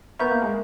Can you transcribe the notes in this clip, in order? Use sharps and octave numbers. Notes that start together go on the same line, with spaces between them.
B3 A#4 E5 A#5 C#6 G6
A#3
G#3